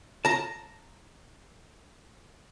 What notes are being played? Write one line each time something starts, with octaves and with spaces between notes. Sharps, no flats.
A5 A#5